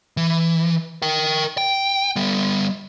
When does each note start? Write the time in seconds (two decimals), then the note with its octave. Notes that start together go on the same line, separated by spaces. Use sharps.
0.17 E3
1.02 A#4 G5
1.58 G5
2.16 G3 B3